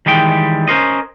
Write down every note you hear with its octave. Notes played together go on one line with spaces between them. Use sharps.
D#3 E3 G3 G#3 G5
C#4 A#4 C5 D#5